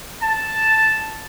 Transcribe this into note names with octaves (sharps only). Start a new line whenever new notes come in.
A5